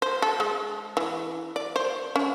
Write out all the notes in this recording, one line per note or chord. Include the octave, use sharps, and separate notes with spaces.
C5
A4
G#3
E3
D5
C5
C#4